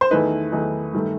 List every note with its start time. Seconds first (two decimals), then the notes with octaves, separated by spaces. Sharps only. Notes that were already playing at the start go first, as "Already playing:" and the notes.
0.01 C5
0.11 E2 D#3 A3 D#4 B4
0.52 E2 D#3 A3 D#4
0.93 G2 D#3 A3